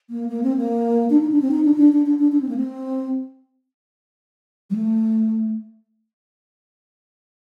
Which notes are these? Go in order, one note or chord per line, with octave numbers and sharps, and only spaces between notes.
A#3
A#3
C4
A#3
D4
D#4
D4
C4
D#4
D4
D#4
D4
D4
D4
D4
D4
C4
A#3
C4
G3
A3